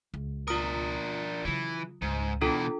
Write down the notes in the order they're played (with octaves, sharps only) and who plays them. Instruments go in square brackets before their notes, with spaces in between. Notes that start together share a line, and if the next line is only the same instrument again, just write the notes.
[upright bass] C#2
[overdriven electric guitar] D4 A#4 [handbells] F4 D#6
[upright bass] C#3 F#3 [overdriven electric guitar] E3
[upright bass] C#2 [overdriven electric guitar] G#2
[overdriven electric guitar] B2 E3 [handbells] D4 F4 A4